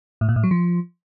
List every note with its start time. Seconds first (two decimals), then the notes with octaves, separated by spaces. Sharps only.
0.21 A2
0.29 A#2
0.36 A2
0.43 F#3
0.51 F3